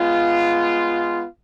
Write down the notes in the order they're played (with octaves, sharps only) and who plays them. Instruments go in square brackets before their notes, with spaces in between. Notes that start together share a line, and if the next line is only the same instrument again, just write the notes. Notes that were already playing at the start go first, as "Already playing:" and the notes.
Already playing: [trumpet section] G#3 B3 F4